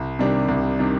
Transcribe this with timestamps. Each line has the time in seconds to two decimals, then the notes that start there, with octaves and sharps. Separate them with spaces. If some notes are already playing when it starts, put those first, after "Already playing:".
Already playing: C2
0.19 C3 D#3 G3 D4
0.48 C2
0.79 C3 D#3 G3 D4